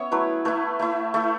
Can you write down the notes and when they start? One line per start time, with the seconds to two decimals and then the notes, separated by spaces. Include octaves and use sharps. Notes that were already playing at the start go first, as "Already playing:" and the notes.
Already playing: B3 C#4 C#5 E5
0.12 F#3 A3 E4 B4
0.45 A3 E4 B4
0.79 A3 E4
1.14 A3 E4 A4